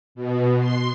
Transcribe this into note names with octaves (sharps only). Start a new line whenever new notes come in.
B2
C6